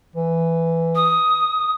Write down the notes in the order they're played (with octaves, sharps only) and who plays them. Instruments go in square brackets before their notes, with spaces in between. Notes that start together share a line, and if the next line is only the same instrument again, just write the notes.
[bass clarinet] E3
[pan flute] D#6